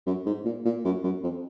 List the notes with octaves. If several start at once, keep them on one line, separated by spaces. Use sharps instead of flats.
F#2
G#2
A#2
A#2
F#2
F#2
F2